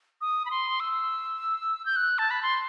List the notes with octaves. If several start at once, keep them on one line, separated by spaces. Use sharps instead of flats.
D#6
B5
C6
E6
G6
F#6
A5
B5
C6